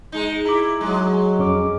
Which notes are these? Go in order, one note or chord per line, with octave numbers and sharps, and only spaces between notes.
G#3 D#4
E4 A#5 D6
F#3 G#3
F2 C#4 D6